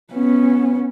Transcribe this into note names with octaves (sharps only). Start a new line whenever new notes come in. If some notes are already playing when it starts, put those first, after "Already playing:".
B3 C#4